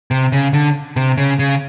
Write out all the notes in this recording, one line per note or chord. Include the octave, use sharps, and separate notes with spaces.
C3
C#3
D3
C3
C#3
C#3